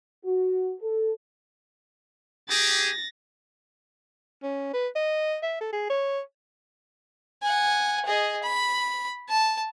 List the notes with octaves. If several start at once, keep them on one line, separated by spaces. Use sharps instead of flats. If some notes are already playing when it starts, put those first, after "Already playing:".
F#4
A4
G4 G#4 A6 A#6
C#4
B4
D#5
E5
A4
G#4
C#5
F#5 G#5
G#4 D#5
B5
A5